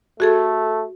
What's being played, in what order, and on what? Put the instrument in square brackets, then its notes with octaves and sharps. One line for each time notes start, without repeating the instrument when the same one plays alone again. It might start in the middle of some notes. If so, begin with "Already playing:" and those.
[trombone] A3 [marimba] F#4 G#4 A4